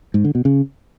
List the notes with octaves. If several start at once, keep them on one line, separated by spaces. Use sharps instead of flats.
G#2
D3
B2
C#3